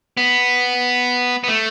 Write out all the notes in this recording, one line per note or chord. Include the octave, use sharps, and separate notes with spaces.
B3
B3
A3